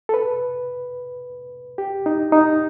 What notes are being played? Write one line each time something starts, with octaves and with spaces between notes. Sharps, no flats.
A4
B4
G4
D#4
D#4